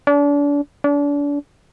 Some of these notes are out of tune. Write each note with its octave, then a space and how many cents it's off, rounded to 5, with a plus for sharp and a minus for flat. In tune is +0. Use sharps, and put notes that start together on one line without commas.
D4 -35
D4 -35